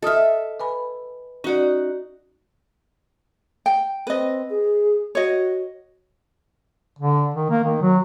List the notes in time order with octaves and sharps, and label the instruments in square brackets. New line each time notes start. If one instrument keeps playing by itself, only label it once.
[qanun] A4 E5 [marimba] D#5 D#6 F6
[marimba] B4 G#5 B5
[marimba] C#4 F#4 D5 [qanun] D#4 F#5
[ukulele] G5
[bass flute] C4 [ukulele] B4 D#5
[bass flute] G#4
[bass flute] F#4 [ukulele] C#5 D#5
[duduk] D3
D#3
A#3
D#3
F#3